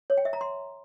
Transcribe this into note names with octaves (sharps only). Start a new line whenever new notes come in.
C#5
G5
E5
A#5
C6